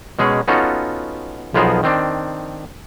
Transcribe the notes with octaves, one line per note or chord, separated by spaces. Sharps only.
B2 G#3 C#4 G#4
B3 C#4 D#4 F4 F#4 A4
B1 F3 B3 G#4 A#4 C5
D#3 C4 D4